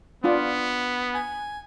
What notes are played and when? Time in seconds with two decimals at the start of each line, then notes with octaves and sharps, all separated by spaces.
0.24 B3 D4 F4 D5
1.14 G#5